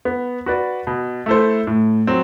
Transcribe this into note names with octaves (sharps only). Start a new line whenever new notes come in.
B3
F#4 B4 D5
B2
A3 E4 A4 C5
A2
F#3 C4